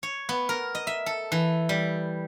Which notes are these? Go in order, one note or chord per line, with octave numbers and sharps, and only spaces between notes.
C#5
B3
A#4
D#5
E5
A4
E3
G3